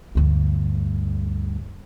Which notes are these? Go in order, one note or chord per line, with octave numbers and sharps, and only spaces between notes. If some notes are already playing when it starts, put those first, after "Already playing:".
D2 G2